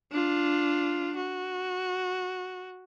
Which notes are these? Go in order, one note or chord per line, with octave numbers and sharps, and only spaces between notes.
D4 F4
F#4